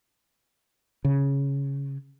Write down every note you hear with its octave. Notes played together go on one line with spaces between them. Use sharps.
C#3